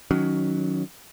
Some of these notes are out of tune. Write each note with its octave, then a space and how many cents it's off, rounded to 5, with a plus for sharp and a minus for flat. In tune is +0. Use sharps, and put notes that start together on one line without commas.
D#3 +5 F#3 +0 C#4 +20